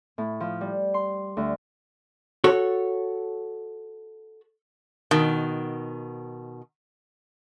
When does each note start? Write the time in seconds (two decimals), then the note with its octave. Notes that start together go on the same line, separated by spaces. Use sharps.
0.18 A2
0.40 F3
0.61 G3
0.94 C6
1.37 D2
2.44 F#4 A4 C#5
5.11 B2 D#3